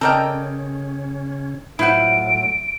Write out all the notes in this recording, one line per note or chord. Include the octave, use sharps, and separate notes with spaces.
C#3 C4 C#4 A4 A#4 D5 D#5 G5
A2 F#3 A3 E4 F4 C5 F#5 D7